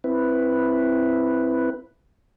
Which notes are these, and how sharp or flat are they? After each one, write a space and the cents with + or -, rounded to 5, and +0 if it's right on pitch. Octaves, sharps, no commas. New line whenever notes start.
C4 +0 E4 +0 B4 +0